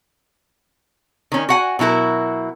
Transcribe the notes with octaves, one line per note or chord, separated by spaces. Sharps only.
D#3 C#4
F#4 F#5 G#5
B2 F#3 E4 F#4 A#4